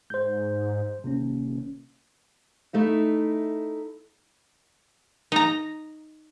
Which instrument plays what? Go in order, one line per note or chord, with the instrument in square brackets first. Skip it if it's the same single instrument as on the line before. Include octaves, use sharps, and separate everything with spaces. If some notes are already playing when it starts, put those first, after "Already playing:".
[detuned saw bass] G#2 [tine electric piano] C5 G6
[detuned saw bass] D#1 [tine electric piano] C3 A#3 C#4
[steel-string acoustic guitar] A3 D#4 E4
[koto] D#4 A#5